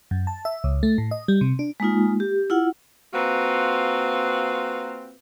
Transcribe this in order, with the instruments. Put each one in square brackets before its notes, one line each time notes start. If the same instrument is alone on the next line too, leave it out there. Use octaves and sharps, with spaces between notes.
[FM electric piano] F#2
A5
E5
C#2
A3
A2
D#5
G3
C3
D4
[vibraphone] G#3 A#3 D#4 F4
G4
E4 F4 F#5
[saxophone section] A#3 C4 F4 F#4 B4